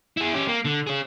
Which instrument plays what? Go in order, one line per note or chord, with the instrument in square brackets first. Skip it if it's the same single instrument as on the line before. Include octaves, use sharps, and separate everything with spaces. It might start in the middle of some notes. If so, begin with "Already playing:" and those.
[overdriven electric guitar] E4 G#4
C#4 G4
A#3
D3
G#4 C#5